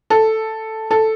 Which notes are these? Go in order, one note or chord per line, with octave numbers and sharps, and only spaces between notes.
A4
A4